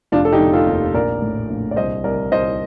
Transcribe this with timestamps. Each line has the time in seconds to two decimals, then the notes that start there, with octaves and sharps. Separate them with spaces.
0.12 F1 D4 F4
0.25 A4
0.33 D#4 G4
0.40 F1
0.53 F4 A4
0.67 D#2
0.94 A#1 A#4 D5
1.22 A2
1.50 A#1
1.71 D5
1.76 C2 C5 D#5
2.04 C2 A#4 D5
2.32 C2 C5 D#5